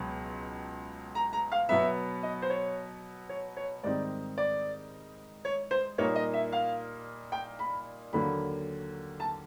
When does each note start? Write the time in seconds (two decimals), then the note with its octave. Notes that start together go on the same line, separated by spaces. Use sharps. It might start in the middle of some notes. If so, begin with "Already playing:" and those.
Already playing: C#2 B2 F#3
1.15 A#5
1.33 A#5
1.52 F5
1.69 B2 F#3 B3 E5
2.23 D#5
2.42 C5
2.50 C#5
3.29 C#5
3.57 C#5
3.84 G#2 D#3 G3 C4 D#4 D5
4.38 D5
5.45 C#5
5.71 C5
5.98 A#2 G3 A#3 D#4 C#5
6.15 D#5
6.34 E5
6.52 F5
7.32 G5
7.59 B5
8.13 D#2 D3 F#3 A#3 B5
9.20 A5